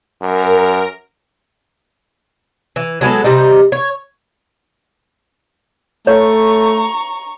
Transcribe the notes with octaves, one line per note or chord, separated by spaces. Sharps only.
F#2 A#4
E3
F#3 G#3 B3 A4
C3 G3 D#4
C#5
A3 C#5 A#5 C#6